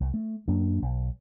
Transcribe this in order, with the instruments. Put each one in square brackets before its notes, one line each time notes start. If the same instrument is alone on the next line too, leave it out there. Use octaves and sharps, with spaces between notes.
[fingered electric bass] C2
A3
F#2 F#3 A#3 D4
B1